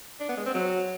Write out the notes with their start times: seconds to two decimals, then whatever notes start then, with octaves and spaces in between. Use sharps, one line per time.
0.20 D4
0.29 B3
0.37 G#3
0.46 C4
0.54 F#3